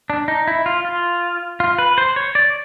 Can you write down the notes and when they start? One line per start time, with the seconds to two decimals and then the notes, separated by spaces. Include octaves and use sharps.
0.10 D4
0.28 D#4
0.48 E4
0.66 F4
0.85 F4
1.60 F4
1.79 B4
1.98 C5
2.16 C#5
2.35 D5